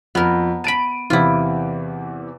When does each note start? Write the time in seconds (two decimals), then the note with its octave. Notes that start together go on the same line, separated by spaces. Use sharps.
0.15 F2 B3 A#4
0.64 A5 B5 D7 D#7
1.10 E2 C3 E3 E4 F4